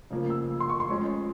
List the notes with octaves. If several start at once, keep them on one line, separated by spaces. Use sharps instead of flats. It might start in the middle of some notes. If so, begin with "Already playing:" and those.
C#3 F3 A#3
E6
C6
C#6
C6
F3 G#3 C#4